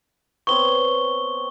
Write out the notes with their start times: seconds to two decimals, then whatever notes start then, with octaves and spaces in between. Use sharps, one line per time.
0.47 B3 C4 C#5 C#6 G7